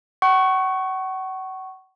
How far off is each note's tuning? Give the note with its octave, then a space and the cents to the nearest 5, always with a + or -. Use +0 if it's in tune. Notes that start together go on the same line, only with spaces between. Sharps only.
F#5 +35 C#6 -5